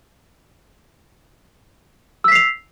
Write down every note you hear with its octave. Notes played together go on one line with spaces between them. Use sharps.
E6 B6 C7 F7